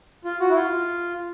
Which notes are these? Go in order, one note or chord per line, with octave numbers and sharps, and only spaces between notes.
F4
F#4
E4
F4